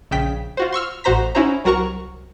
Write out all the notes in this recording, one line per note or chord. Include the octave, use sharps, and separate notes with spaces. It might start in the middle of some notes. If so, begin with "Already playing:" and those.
A#1 C#3 G5 B6
F4 F#4 C5
C6 C#6 E6 F6
A1 A2 F#4 C5 A#5 B6
C#4 D#4 E4 F#4 C5 A#5
C2 F#3 F#4 A#4 A#5 C#6